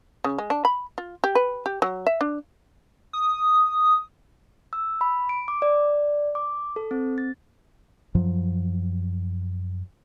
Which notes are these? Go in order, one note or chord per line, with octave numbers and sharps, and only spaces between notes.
C#3
G#3
D4
B5
F4
G4
B4
G4
F#3
E5
D4
D#6
E6
B5
D7
D6
D5
D6
A4
C4
A6
F#2 F3 F#3